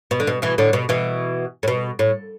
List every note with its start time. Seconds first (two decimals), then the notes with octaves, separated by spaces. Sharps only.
0.11 B2
0.20 D3
0.27 B2
0.42 B2 E3
0.58 A2 D3
0.73 B2
0.89 B2 E3
1.63 A2
1.68 B2
1.99 A2